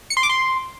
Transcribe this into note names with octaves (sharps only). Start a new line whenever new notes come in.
C#7
C6
D6
C6